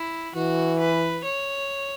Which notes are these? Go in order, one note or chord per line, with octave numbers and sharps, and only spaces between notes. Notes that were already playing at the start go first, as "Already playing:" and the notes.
Already playing: E4
E3 F#4
B4
C#5